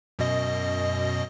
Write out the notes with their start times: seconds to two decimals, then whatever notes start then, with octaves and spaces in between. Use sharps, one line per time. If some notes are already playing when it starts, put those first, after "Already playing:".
0.19 F#2 B2 D#5